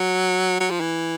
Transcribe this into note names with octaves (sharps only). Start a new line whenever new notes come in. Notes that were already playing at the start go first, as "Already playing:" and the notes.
Already playing: F#3
F#3
F3
E3